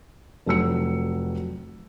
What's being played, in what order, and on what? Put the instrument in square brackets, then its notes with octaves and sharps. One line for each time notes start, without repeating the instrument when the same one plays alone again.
[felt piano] F1 F#3 E6 C#7